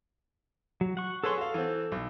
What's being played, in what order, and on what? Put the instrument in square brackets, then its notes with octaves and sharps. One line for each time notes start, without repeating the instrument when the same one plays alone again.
[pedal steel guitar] F#3
F#5 C#6
[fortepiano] G#4 B4 C#5 [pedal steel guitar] A4 C6
[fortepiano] F#4 F5 [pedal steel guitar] A4
[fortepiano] E3 C4
B1